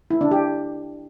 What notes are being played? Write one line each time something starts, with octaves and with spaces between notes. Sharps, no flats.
E4
D4
G4